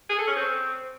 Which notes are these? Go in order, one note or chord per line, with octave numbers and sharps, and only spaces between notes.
G#4
A4
C#4
C4